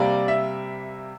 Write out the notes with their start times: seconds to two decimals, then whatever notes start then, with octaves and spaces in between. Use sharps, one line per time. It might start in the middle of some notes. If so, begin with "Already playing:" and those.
Already playing: C3 G3 A#3 D5
0.28 E5